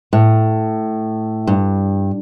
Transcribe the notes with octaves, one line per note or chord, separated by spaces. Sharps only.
A2
G2